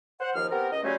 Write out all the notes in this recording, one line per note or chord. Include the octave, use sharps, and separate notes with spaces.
C5 F#5
D#2 F3 F6
B3 C4 G4 A#4
C#2 D#5
C#3 F#3 G3 A3 C4 C#4